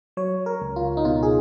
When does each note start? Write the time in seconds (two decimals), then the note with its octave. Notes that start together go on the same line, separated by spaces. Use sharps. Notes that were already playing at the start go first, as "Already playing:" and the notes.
0.17 F#3 C#5
0.46 A#4
0.62 C#2
0.76 F4
0.97 D#4
1.05 B2 F4
1.23 G#4